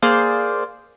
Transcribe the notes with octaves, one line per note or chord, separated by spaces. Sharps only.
A#3 G#4 C5 D5 F5